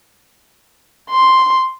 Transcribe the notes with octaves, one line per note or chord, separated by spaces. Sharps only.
C6